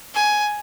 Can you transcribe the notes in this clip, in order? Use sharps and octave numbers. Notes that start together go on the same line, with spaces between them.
G#5